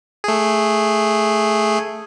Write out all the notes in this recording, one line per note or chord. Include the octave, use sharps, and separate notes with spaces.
A3 G#4